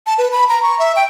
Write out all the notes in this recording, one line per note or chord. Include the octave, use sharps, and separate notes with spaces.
A5
B4
B5
A#5
C#6
E5
G5